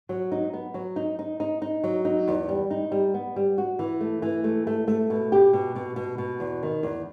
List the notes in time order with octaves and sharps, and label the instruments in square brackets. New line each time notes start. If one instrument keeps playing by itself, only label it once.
[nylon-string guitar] F#3
D#4
B3
F#3
D#4
D#4
D#4
D#4
F#3
D#4
E2
G3
D#4
G3
B3
G3
F#4
E3
A3
E3
A3
A3
A3
B2
G4
B2
B2
B2
B2
E2
D#3
E2